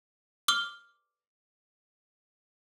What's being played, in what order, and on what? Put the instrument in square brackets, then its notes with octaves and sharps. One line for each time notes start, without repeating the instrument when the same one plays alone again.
[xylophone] D6 F6 G7